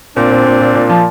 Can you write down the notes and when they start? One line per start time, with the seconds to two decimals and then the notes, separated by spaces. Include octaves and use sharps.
0.16 A#2 C4 D4
0.31 A#2
0.46 A#2
0.61 A#2
0.75 A#2
0.89 F3